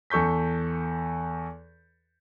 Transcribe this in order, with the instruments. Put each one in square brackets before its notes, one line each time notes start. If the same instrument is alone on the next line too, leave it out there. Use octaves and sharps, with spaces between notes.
[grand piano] E2 A4 C#6 G6 B6